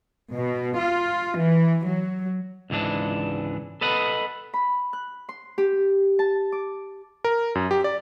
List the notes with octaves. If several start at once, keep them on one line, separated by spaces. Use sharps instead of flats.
B2
F4
E3
F#3
C#2 G#2 E3 D4
A4 B4 D#5 F#5
B5
F#6
C6
G4
A5
D6
A#4
F#2
G4
D5